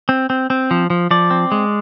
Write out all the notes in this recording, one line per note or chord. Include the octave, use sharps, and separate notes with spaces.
C4
C4
C4
F3
F3
F3 D5
C4
G#3